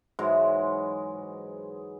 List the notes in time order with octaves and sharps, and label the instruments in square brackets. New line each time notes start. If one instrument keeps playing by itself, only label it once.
[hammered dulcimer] G#2 E3 F#3 G#3